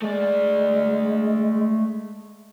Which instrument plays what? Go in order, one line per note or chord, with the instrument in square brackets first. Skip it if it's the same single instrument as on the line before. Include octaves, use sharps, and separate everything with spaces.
[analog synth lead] G#3 [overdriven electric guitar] A3 D5